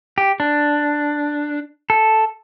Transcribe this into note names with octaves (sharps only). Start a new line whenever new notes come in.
G4
D4
A4